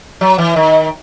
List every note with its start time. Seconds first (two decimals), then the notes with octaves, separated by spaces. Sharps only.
0.21 F#3
0.38 E3
0.56 D#3